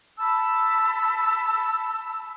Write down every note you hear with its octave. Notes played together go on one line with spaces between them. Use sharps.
A5 B5 E6